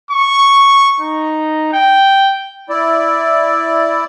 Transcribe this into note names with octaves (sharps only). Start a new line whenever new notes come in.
C#6
D#4
G5
E4 D5